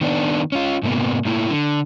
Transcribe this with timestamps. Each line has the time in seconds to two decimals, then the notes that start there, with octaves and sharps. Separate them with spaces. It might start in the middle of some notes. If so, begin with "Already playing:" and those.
0.01 D#3 B3 D4
0.52 C#4 F4
0.83 G#2 C3 A#3 B3
1.25 A2 A#3 E4
1.50 D3